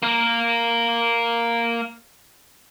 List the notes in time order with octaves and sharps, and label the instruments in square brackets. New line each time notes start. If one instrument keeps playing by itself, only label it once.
[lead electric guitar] A#3 A#4